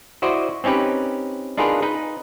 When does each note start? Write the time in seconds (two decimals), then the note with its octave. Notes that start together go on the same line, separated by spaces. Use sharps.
0.22 E4 F#4 C5 D5 D#5
0.64 C4 C#4 D#4 G4 B4
1.57 D4 D#4 F4 G#4 A#4 B4
1.82 D#4 B4